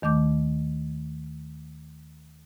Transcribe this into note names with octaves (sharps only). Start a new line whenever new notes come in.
D#2 D#3 A3 D6 G6